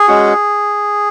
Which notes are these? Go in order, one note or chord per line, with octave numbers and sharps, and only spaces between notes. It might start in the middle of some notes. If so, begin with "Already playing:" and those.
Already playing: G#4
G#3 C#4 F#4